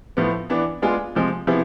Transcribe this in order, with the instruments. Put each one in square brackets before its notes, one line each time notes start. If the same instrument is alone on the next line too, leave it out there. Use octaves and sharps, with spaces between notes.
[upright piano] A2 F3 B3
E3 B3 D4
G#3 B3 D4 F4 G#4
C3 F3 G#3
C3 F3 B3 E4 G#4